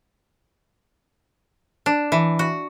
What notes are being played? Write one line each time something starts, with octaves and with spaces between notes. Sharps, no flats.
D4
E3
F#4